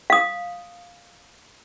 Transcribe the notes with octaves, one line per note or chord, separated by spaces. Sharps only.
F5 D#6